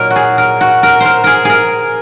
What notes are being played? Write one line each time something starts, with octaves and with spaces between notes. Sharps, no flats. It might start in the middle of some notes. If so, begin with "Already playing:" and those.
Already playing: A#2 F#3 A#3 D#4 A#4
F#4
G#4
A#4
F#4
A#4
A#4 C5
G#4 A#4
G#4 A#4